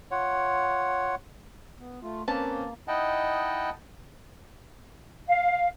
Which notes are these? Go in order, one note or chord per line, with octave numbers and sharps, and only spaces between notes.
F4 C#5 F#5
B3
A3 F4
A#3 C4 C#4 B4 A5
D#4 E4 D#5 F#5 G5 A5
F5